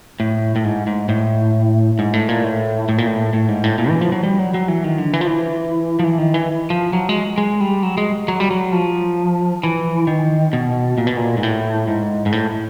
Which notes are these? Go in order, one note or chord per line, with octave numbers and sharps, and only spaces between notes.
A2
A2
G#2
G#2
A2
G#2
A2
A#2
A2
A2
A#2
A2
A2
G#2
A2
A#2
E3
F3
F#3
G3
F#3
F#3
E3
D#3
D3
E3
F3
E3
F3
E3
D#3
E3
F3
F#3
G#3
G#3
G3
F#3
G#3
F#3
G3
F#3
F3
E3
D#3
B2
A#2
B2
A#2
G#2
A2
G#2
G#2
A2